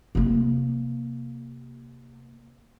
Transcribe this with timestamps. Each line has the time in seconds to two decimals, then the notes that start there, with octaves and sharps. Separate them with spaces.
0.15 C3 A#3